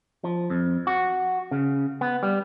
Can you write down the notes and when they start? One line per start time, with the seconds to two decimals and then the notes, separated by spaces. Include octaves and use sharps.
0.24 F3
0.50 F2
0.87 F#4
1.51 C#3
2.01 B3
2.23 G3